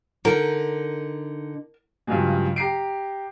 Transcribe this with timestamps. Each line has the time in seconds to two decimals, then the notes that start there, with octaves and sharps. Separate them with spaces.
0.25 D3 D#4 A#4
2.07 G2 C#3 F3 F#3 G#3
2.56 G4 A#5 C7 D7